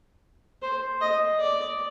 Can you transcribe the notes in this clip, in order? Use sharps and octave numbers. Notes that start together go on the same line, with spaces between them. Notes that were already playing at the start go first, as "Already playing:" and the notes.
C5
D#5
D5